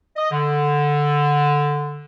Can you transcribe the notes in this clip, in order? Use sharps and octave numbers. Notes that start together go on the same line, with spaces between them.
D#5
D3